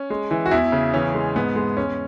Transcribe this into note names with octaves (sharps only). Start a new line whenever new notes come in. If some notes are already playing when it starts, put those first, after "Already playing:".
Already playing: C#4
G#3
E3
F#4
E2 E4
C#3
E3 C#4
G#3
G#2 B3
G#3
E2 C#4